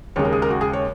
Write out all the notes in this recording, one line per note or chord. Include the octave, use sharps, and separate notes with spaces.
D#2 C#3 G#3 C#5
A#4
G#4
A#4
F#4
G#4
C#5